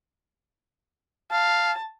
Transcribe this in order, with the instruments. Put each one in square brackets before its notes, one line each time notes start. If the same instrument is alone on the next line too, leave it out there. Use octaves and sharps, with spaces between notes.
[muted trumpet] F5 [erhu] A5